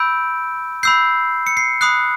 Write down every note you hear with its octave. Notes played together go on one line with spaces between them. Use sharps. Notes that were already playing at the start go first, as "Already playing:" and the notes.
Already playing: B5 E6 G6 D7
B5 E6 G6 C7
C#7
C7
B5 D#6 F#6 C7